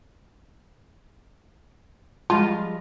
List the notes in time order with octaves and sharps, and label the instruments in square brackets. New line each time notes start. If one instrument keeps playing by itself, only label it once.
[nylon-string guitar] F3 G3 G#3 [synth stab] F4 [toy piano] A5